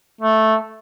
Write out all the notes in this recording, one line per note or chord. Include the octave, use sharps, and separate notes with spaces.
A3